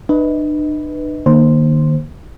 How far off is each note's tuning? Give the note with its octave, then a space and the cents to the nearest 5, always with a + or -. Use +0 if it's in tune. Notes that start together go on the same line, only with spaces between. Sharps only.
D4 +45 B4 +0 D#5 +35
D#3 -40 A#3 +0 C5 +0